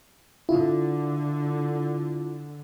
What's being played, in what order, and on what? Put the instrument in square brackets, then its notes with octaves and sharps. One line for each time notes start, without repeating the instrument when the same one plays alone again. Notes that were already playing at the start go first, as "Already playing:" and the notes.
[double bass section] D3 [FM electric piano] E4 F4